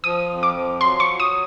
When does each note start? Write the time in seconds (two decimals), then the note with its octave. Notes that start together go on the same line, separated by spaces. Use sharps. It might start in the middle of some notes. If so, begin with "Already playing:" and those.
0.04 F3 D#6
0.30 F2
0.43 D6
0.55 F3
0.80 F#3 C6
1.00 C#6
1.06 F#3
1.20 D#6